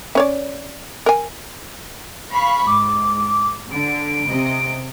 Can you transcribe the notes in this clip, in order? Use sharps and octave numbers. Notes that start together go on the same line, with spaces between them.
C#4 C#5 D5
A#4 G#5
F5 B5 C#6
G#2 D6
D3 D7
C3 D#5